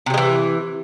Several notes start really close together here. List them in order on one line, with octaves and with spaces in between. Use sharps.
C3 F#3 G#3 E3